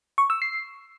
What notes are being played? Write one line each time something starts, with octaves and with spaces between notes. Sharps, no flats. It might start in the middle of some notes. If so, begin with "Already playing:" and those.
C#6
E6
C7